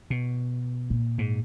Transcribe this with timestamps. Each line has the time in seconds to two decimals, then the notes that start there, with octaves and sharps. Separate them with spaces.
0.10 B2
0.90 A#2
1.18 G#2